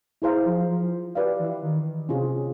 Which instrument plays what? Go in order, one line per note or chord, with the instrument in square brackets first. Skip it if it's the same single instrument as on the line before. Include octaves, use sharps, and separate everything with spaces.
[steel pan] E4 G#4 C5 F5 A#5
[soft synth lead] F3
F3
[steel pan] G4 B4 D5 F5
[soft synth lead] E3
D#3
[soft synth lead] C3 [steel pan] C#4 F4 G#4 C5